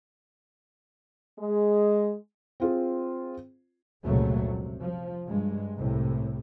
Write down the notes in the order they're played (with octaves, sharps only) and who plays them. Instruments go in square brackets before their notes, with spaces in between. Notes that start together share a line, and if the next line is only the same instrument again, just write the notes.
[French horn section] G#3
[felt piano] C4 F4 G#4
[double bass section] F1 C#2 A#2 C#3 F#3 A3
C3
F3
G2 G#3
C2 A2 C3